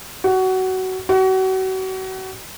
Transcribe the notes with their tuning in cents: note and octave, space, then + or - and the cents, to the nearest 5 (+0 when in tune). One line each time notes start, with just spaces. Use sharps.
F#4 +20
F#4 +35